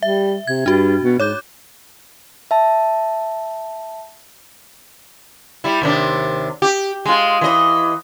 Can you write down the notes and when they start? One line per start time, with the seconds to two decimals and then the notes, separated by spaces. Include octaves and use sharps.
0.03 G3 E5
0.47 C3 G#6
0.66 G2 D4 F#4
1.02 B2
1.20 G#2 C#5 D6 G6
2.51 E5 A5
5.64 G3 E4
5.82 D#2 C3 D4
6.62 G4
7.06 G#3 F4
7.41 E3 D#5